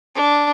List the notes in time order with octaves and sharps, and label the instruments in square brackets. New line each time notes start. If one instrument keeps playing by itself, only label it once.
[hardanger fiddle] D4